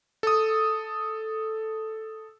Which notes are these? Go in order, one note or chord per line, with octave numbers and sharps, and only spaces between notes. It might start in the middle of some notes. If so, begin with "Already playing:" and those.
A4 D#6